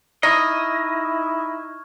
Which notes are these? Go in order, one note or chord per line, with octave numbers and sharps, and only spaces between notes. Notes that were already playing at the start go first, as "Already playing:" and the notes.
D#4 E4 D#5 C#6 F6 G#6